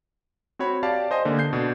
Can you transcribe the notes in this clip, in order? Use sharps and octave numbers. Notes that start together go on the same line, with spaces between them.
C4 F#4 C#5 B5
G4 D5 F5 A5
C5 D#5 G#5 C6
D3 A#3
G6 C7
B2 D4